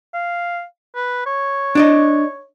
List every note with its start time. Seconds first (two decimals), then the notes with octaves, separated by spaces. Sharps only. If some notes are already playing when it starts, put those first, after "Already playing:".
0.14 F5
0.96 B4
1.26 C#5
1.75 D4 D5 D#5